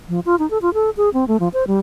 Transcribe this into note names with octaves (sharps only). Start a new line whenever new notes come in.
F3
F4
D#4
A4
F4
A4
G#4
C4
A3
F3
C5
G3